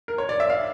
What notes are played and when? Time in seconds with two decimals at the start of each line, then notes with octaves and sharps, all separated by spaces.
0.08 A#4
0.18 C#5
0.29 D5
0.40 E5
0.50 F5